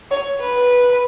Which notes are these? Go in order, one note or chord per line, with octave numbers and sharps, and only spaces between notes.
C#5
B4